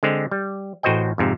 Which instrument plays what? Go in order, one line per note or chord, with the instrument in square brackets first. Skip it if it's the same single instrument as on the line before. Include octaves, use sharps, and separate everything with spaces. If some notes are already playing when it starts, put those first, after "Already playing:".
[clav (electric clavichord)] D3 G#3 C4
G3
A1 A2 F#4 C5 D#5 G5
F2 G#2 C3